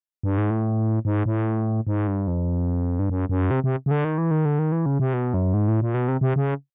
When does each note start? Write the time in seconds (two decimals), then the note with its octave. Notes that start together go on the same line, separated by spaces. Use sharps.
0.23 G2
0.38 G#2
0.50 A2
1.05 G#2
1.26 A2
1.87 G#2
2.07 G2
2.27 F2
2.99 G2
3.10 F#2
3.29 F#2
3.51 C3
3.64 C3
3.86 C#3
3.91 D3
4.05 D#3
4.18 E3
4.31 D#3
4.45 D3
4.59 D#3
4.72 E3
4.86 C#3
5.00 C3
5.13 B2
5.34 F#2
5.54 G#2
5.68 A2
5.81 A#2
5.94 B2
6.08 C3
6.21 C3
6.36 C#3